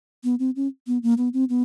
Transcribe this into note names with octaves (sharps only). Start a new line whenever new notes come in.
B3
C4
C#4
B3
A#3
B3
C4
B3